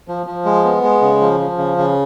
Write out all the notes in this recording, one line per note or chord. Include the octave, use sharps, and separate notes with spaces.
F3
F3
G#3
B3
G#3
C#3
F3
F3
C#3
C#3